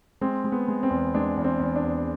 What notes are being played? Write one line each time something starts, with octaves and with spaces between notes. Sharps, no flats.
G#3 C4
G#3
B3
G#3
C4
E2
G#3 D4
E2
C4
E2
D4
E2